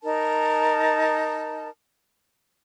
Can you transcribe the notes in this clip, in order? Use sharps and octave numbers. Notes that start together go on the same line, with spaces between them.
D#4 A#4 A5